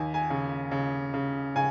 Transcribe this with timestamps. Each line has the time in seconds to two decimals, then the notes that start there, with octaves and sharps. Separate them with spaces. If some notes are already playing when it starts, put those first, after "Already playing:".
Already playing: D#2 G#5
0.14 G#5
0.30 C#3
0.71 C#3
1.14 C#3
1.56 C#3 G#5